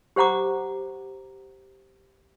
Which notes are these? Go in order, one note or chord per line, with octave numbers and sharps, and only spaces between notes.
G4 C5 F#5 A#5 D6